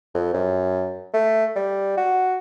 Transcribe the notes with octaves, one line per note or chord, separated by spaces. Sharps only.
F2
F#2
A3
G3
F#4